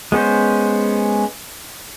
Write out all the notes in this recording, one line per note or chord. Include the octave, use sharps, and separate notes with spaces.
G#3 B3 C#4 C5